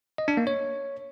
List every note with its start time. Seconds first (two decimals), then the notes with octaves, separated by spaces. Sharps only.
0.18 D#5
0.28 D4
0.37 A#3
0.47 C#5